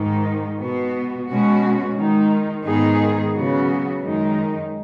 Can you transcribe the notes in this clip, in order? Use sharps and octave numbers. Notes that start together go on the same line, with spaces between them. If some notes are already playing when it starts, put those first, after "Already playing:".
Already playing: G#2 D#3 G#3 D#4
B2 B3 F#4
B2 G#3 C#4 F#4
D#3 G#3 D#4
G#2 D#3 B3 D#4 G#4
C#3 F#3 B3 F#4
F#2 D#3 G#3 D#4